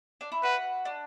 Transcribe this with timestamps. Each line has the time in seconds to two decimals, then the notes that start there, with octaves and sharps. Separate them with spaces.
0.21 D4
0.32 E4
0.43 F#4 B4
0.85 D4